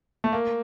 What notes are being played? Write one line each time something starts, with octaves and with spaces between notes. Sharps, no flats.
A3
A#3